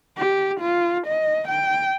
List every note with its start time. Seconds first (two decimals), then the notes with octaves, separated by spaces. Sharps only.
0.17 G4
0.60 F4
1.07 D#5
1.48 G5